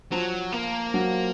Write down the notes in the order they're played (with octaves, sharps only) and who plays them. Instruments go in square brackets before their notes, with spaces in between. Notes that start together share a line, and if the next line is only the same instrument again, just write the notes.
[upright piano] F3 [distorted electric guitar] F#3
[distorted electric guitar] A#3
[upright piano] F#3